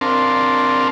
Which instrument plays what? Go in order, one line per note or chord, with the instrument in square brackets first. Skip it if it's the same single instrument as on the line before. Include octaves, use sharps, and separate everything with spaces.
[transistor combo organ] C4 D4 A#4 F5 A5 C6